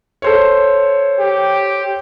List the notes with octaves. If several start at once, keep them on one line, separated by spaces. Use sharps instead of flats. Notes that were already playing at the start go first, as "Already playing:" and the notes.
A4 C5 C#5
G4